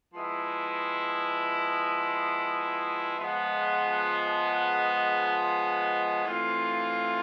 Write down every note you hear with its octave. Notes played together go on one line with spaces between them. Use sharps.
F3 G#3 B3 E4
F3 G#3 B3
E3 A3 C4 F4